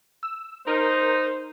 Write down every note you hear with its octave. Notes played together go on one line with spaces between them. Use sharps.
E6
D#4 A#4 C5